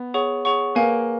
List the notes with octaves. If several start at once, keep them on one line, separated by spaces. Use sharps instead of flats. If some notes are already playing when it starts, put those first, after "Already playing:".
Already playing: B3
G#4 C#5 F#5 C#6
G#4 C#5 F#5 C#6
A#3 B4 F5 G#5